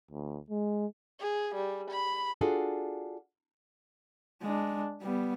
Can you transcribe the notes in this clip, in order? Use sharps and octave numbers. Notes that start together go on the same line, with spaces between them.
D2
G#3
G#4
G3
B5
D4 F4 F#4 G#4 A4
G#3 D4
G3 B3